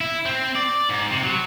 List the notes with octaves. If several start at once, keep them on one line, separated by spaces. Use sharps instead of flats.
E4
C4
D5
G#2
C3
F#3